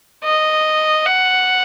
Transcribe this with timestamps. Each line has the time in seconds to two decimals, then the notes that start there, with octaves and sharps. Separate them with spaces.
0.24 D#5
1.06 F#5